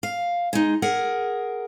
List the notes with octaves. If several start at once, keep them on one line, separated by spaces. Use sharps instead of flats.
F5
G#3 D#4
G#4 A#4 F#5